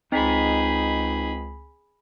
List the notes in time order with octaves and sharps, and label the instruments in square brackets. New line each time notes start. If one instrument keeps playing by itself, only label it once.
[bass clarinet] C#2 [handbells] C4 B6 [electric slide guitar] D#4 [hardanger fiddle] G#4 B5